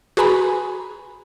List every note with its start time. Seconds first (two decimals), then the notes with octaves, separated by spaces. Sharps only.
0.17 F#4 G#4 B4 G#5 A#5 B5